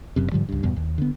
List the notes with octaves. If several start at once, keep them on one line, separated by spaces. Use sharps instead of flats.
F#1 F#2 C3
G#2 D3 F3 G3
C#2 G2
E2 G2 B2
D#2
D3 B3